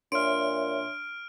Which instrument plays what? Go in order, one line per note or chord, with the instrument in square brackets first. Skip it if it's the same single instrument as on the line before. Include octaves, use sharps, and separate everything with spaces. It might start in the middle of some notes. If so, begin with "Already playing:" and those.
[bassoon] A#2 [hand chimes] D4 C6 [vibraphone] C#5 E5 [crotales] F6 D7